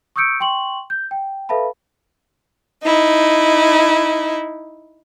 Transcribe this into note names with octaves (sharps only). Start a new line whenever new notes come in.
C#6 D#6 E6 G6 C#7 D7
G5 C6 C#6 F#7
G6
G5
A4 B4 E5 F5 A5 B5
D#4 E4